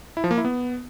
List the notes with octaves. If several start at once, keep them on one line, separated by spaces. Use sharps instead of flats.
E4
F3
A#3
E4
B3